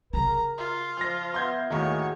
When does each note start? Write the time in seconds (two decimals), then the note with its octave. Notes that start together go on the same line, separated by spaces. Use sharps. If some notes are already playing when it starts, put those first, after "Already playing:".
0.14 C#3 E4 A#4 A#5
0.58 F4
0.97 F3 F6 A#6
1.34 B3 E5 C6 G6 G#6
1.70 D#2 A2 D#3 F#4 G#4 C#5